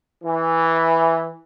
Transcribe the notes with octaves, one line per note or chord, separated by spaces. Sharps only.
E3